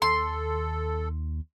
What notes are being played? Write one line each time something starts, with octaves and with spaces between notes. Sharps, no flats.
D#2 A4 C6